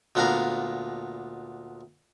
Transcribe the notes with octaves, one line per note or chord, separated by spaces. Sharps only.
D2 A#2 B3 D4 F5 A#5